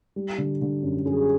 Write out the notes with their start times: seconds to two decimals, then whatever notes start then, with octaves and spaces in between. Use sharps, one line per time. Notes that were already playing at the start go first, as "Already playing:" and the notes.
0.16 G3
0.38 D3
0.61 D3
0.83 F#2
1.05 F#2 G#4